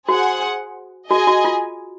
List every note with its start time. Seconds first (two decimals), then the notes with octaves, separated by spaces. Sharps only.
0.08 F#4 G#4 C5 F#5
1.10 F#4 G#4 D#5 G#5
1.27 F#4
1.45 F4